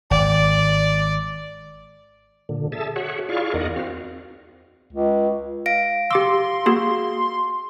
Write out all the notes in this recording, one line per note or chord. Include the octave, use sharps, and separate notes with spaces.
G#1 D5
A#2 D3
G#4 A4 E5 A5
F#4 G#4 C#5 E5 F#5
E4 F4 G#4 D5 F5 C#6
E2 D#4 A#4 D5 D#5 F#5
C4 F#4 F5
C#2
F5 A#6 D7
G4 C6 D6 E6
A#3 F#4 G#4